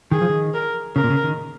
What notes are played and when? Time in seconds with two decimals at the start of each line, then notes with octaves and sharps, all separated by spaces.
0.11 D#3 G#4
0.21 F3
0.30 D#3
0.54 A#4
0.96 C#3 A#4
1.04 A#2
1.10 C#3
1.24 D#3